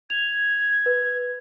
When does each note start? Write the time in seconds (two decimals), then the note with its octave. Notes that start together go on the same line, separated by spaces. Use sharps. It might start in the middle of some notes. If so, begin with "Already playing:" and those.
0.10 G#6 F7
0.86 B4